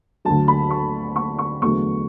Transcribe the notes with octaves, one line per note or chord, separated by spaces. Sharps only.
D2 D3 F#3 A5
B5
C#6
C#6
C#6
E2 D3 F#3 A3 C#6